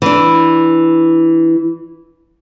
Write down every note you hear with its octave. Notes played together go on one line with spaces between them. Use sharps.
E3 D4